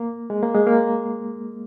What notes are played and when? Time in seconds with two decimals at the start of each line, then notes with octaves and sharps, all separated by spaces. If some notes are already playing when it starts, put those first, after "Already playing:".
Already playing: A#3
0.30 G#3
0.42 A#3
0.55 G#3
0.67 A#3